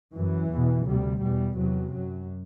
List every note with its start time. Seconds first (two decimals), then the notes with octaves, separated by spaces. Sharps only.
0.13 F#2 E3
0.50 E2 B2
0.85 D2 C3 G3
1.20 E2 B2 G3
1.55 E2 C3 F#3
1.91 F#2 F#3